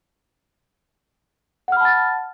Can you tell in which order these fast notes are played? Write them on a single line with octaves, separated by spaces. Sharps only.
F#5 F6 B5 A5 A6